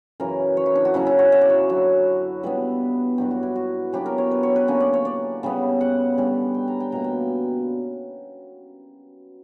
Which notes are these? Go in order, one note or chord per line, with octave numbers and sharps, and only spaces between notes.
F#2 C#3 E3 A#4
C#5
E4
D4
F#4
C#3 F#3 C#4 E4
E4
F#4
E5
D5
C#5
F#2 D3 F#3
C#3 G3 B3 D4 B4
G2 F#3 B3 D4 G4
F#4
E4
F#4
C#3 F#3 B3 D4 G4
A#4
C#5
B4
C#5
B4
D3 A#3 C#4 C#5
D5
C#5
D5
C#3 G3 B3
F#5
D3 G3 C#4
G5
A#5
G5
B2 G3 A#3 A#5
G5